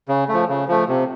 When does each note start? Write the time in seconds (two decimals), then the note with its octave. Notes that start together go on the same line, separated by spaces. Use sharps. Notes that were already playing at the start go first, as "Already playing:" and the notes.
0.08 C#3
0.28 F3 A3
0.49 C#3
0.68 F3 A3
0.88 C3